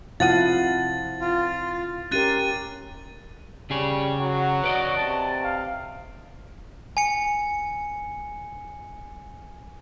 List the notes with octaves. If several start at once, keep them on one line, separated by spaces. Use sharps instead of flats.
C3 F3 E4 F5 F#5 A6 D#7
F4
C#4 G4 A#4 C6 F#6 A6 D#7
C#3 G3 G#4 C#5
F#3 F#4
B4 D5 D#5
C3 A5
F5
G#5 C#7